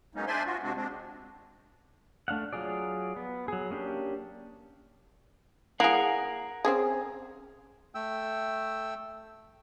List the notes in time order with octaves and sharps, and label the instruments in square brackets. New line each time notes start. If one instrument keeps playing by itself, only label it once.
[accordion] F#3 G#3 A#3 B3 C#4 D#4
D4 C5 D5 E5 G#5 C6
F4 F#4
C3 G#3 C4 D4 F#4
G#3 C4 D4
[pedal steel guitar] A3 D4 F5 F#5
F#3 F4 G#4 D5
B3
F#3 G#4
A#3 C#4 D4 G4
[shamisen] E4 G#4 [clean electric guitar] A#4 F5 F#5
[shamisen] C4 C#4 G#4
[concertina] A3 G5 E6